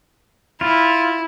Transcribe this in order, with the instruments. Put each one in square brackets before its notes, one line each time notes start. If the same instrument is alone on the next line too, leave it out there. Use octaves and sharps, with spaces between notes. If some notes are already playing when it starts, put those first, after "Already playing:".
[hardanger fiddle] E4 [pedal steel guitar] F4